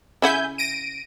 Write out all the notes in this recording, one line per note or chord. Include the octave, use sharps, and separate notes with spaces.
C#3 E4 E5 F#5 G#5 G6
A#6 D7 D#7